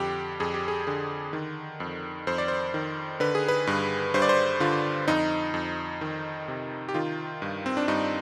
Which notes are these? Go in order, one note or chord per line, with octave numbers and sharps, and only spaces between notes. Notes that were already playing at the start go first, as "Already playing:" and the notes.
Already playing: F2 D3 G4
F2 G#4
G4
G#4
D3 G#4
D#3
F2
F2 C5
D5
C5
D#3
D3 B4
G#4
B4
G2
G2 C5
D5
C5
D3 F4
F2 D#4
F2
D#3
C3
G4
D#3 F4
G2
C4
D4
G2 D#4